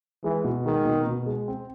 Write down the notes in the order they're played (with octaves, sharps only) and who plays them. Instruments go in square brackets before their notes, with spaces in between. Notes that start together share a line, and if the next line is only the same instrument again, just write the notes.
[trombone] E3 [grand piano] G#3
[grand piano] B2
[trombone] D#3 [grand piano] G#3
[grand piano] B2
B2
G#3
C4